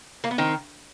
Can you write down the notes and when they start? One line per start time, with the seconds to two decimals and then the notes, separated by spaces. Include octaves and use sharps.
0.24 A#3
0.31 B3
0.38 D#3 C4